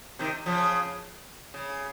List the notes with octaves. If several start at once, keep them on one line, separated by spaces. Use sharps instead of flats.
C3 D#3
C#3 F3
C#3